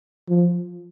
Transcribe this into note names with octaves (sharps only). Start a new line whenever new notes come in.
F3